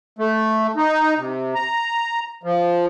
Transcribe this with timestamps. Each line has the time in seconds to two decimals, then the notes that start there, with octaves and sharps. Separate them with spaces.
0.19 A3
0.76 D#4
1.17 C3
1.54 A#5
2.43 F3